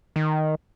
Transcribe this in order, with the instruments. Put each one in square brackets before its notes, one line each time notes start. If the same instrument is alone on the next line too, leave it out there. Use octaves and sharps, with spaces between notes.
[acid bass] D#3